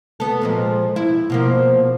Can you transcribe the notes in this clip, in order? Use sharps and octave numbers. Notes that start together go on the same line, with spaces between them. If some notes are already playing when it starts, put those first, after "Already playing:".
B3 A4
A#2 F3 G#3
E4
B2 F3 A#3